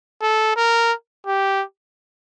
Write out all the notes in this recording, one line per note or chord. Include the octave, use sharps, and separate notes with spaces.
A4
A#4
G4